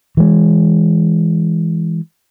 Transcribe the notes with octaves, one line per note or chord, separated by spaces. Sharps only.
E3 G#3